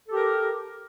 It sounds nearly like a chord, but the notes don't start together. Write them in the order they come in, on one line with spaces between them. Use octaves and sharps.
A4 G4 A#4